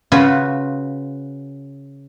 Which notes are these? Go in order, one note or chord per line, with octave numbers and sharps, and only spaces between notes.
C#3 F4 F#4 B4 C#5 B5